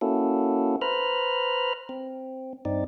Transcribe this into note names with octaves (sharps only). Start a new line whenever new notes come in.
A#3 C#4 E4 F#4 A4
B4 C5 A#5 B5 F6
C4
G2 C4 D#4 D5